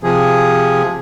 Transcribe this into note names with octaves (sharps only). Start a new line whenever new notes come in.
C3 F3 G#4